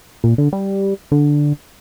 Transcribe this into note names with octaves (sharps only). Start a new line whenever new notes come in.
A#2
D3
G3
D3